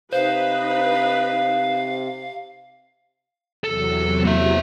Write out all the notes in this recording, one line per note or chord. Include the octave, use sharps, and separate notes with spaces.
C3 D#4 B4 C5 F5
E2 C3 F#3 A4
A#3 E5